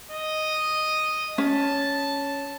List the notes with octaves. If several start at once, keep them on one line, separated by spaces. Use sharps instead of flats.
D#5
C#4 A5